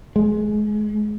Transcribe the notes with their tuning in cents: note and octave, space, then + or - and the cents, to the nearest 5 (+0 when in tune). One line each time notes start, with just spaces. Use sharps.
G#3 +25